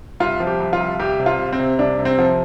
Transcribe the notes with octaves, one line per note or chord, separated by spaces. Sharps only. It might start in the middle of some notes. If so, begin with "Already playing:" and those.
C2 F4
F3
G4
C2
F4
C2
C2 G4
C3
F4
C3
C4
C3
C2 D4
C3
C4
F3